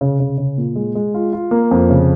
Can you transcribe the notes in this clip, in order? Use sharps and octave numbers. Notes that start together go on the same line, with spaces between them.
C#3
C#3
C#3
A#2
G#3
G#3
F4
F4
A#3
F2
C#3